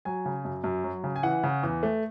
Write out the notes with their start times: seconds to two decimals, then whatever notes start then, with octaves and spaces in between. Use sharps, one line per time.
0.05 F#3 G#5
0.26 C#3
0.45 F#2
0.64 F#2
0.84 F#3
1.04 C#3
1.16 G#5
1.23 E3 F#5
1.43 C#3
1.63 E2
1.83 A3